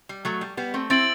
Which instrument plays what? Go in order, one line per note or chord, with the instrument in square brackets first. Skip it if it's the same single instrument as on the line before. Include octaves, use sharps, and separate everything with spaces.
[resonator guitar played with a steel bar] G3
F#3 A3
G3
G3 B3
A3 C4
[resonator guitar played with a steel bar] C4 E4 [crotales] A6 D7 F#7